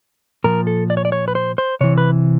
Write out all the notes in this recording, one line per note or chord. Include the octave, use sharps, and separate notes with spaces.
A#2 F3 A#4
A4
D5
C#5
D5
C#5
B4
C5
C5
C3 E3 C#5
B4